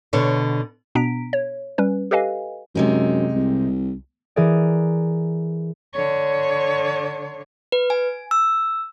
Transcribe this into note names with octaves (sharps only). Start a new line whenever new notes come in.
B2 D3 C#5
B2 B3 D4 A#5 B6 D7
C#5
G3 C#4 B4
G4 A4 B4 D#5 F5 G#5
F#2 C3 G#3 D#4
C2
E3 G#4 A#4 D5
D3 C#5
B4
G#5
E6